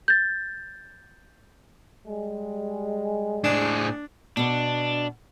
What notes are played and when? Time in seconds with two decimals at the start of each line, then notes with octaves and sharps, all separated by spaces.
0.08 G6 A6
2.07 G3 G#3
3.44 A2 D4 G#4
4.37 B2 B3 D4